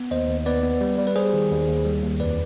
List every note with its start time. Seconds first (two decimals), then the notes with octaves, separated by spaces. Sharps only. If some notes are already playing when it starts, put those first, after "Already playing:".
Already playing: B3
0.11 D#2 C5 D#5
0.29 D#2
0.46 B3 B4 D5
0.63 B3
0.81 G3
0.98 G3
1.07 B4
1.16 G3 G#4 C5
1.33 D#3
1.51 D#2
1.68 D#2
1.85 G3
2.03 D#2
2.20 F2 B4 D5